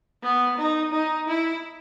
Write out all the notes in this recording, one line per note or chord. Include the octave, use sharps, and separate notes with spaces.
B3
D#4
D#4
E4